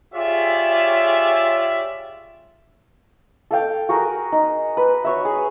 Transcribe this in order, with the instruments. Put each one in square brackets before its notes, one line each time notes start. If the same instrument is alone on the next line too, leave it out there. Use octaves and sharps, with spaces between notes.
[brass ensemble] F4 G4 G#4 C#5 D5 E5
[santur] A4 F5 G5
F#4 G#4 A#4
D#4
B4
F#4 C#5 E5
G#4